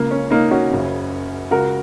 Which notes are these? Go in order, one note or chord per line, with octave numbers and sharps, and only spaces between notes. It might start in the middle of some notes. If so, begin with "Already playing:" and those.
Already playing: C#2 C#3 A#3
C#4
A#3 D#4
C#4 F#4
F#1 F#2 C#3
C#2 C#3 F#4 A#4